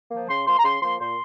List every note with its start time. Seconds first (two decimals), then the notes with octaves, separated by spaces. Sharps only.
0.11 F3 A#3
0.29 C#3 C6
0.46 F3 A#3 C6
0.59 A#5
0.64 C#3 C6
0.82 F3 A#3 C6
1.00 A#2 C6